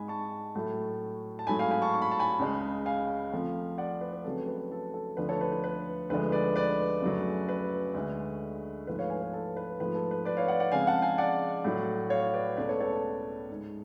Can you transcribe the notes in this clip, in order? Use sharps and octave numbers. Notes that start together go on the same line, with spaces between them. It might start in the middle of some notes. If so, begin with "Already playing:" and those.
Already playing: G#2 G#3 G#5 B5
A5 C#6
A2 F#3 A3
A5
G#2 F#3 A3 G#5 B5
F5 G#5
G#5 B5
A5 C#6
C#6
B5
A5
G#5 B5
C#2 C#3 G#3
F5 G#5
F2 F3 A3
D5 F#5
B4
B4
F2 C#3 F#3 A3 A4
B4
A4
A4
D2 D3 F3 A3 B4
A4 C#5
B4
B4
B4
D2 D3 F3 G#3 B4
B4 D5
B4 D5
F#2 C#3 F#3 A3
B4
D2 D3 G#3
G#2 F3 A3 B4
C#5 F5
F5 G#5
B4
A4
B4
G#2 F3 A3 B4
A4
B4
B4 D5
C#5 F5
D5 F#5
D5 F#5
F2 C#3 G#3 F5 G#5
F#5 A5
F5 G#5
D5 F#5
A2 F#3 A3
C#5 F5
B4 D5
C#2 B2 A3 B4 D5
A4 C#5
A4 C#5
A4
G#2 G#3